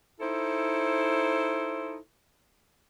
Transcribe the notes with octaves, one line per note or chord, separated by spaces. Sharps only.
D#4 E4 A4 C5